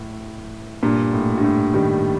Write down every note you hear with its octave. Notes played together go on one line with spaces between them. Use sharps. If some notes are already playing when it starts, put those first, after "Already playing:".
Already playing: A2
G2 A#2
A2
G2
A2
D#3 G3